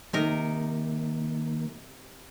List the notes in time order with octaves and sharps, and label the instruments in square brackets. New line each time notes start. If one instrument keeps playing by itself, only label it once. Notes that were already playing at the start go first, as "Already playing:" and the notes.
[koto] C3 D#4 A#4 [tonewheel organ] D#3 A#3